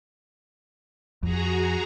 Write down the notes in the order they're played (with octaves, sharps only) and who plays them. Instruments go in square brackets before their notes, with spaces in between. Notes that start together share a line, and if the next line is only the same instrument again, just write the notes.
[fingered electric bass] F2 [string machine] F#4 G#4 A#5